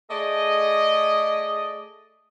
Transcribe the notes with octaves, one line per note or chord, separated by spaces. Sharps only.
A3 G#4 D5 D#5